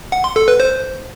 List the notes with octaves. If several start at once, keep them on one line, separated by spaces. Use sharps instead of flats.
F#5
C6
A4
B4
C5